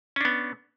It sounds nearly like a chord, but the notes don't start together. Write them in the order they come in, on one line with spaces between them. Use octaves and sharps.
C#4 D4 B3